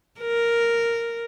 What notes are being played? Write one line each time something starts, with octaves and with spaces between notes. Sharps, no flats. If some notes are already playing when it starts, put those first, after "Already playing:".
A#4